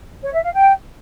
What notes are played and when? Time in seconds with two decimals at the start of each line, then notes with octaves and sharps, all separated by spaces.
0.23 C#5
0.33 E5
0.43 F5
0.53 G5